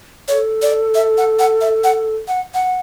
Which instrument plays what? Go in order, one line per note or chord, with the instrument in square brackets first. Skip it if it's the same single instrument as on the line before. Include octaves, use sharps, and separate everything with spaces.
[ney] A4 [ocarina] C#5
[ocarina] D5
E5
F#5
F#5
E5
F#5
F#5
F#5